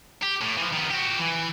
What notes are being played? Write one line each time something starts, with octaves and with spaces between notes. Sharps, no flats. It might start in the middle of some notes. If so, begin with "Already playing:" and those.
G4
A2
E3 F3
D#3 B3
F#4 G4
E3